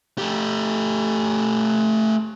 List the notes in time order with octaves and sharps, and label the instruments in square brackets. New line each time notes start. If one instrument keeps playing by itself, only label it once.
[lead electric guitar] A3 G4